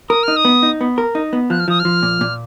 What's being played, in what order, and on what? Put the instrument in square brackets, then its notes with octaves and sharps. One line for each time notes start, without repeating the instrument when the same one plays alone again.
[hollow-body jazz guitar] A#4 [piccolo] D#6
[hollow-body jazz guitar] D#4 [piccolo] F6
[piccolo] D#6
[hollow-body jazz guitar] B3
D#4
B3
A#4
D#4
B3
[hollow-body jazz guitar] F3 [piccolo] F#6
[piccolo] F6
[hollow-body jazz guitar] F3 [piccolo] D#6
[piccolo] F6
[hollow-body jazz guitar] F3
A#2
A#2